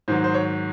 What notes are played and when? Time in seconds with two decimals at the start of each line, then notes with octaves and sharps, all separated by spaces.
0.08 G#2 D#3 F#3 C5
0.24 C5
0.34 C#5